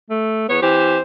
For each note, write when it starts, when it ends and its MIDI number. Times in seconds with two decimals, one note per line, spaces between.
0.10 0.47 57
0.48 0.61 40
0.48 0.58 59
0.48 0.61 73
0.62 0.97 52
0.62 0.97 60
0.62 0.97 67
0.62 1.02 72